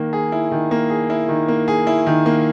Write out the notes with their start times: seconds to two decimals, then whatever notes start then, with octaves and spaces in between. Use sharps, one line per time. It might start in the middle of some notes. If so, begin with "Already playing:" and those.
Already playing: D#3 A#3
0.13 G#4
0.32 E4
0.52 D#3
0.71 A#3
0.90 G#4
1.10 E4
1.29 D#3
1.48 A#3
1.68 G#4
1.87 E4
2.07 D#3
2.26 A#3